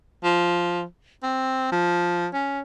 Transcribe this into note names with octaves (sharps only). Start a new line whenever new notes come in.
F3
C4
F3
C#4